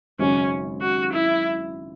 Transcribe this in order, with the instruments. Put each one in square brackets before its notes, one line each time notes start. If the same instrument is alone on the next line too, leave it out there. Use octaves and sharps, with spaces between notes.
[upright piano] G#1 F#2 C#3 F#3 [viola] C#4
[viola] F#4
E4